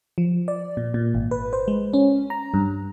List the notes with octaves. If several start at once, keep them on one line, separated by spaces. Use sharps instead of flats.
F3
D5
A#2
A#2
G#1
B4
C5
G#3
C#4
A#5
G2